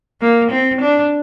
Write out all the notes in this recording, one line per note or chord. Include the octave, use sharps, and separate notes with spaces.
A#3
C4
D4